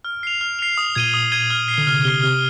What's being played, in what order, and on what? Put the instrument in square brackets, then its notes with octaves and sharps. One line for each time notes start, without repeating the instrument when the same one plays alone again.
[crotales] F6
C7 F7
F6
C7 F7
D#6
[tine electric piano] A#2 [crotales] G#6 D#7 G7
[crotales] D#6
G#6 D#7 G7
F6
C7 G7
[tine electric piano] D3
[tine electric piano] C3 [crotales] F6
[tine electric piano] C3 [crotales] C7 G7
[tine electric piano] C3 [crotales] F6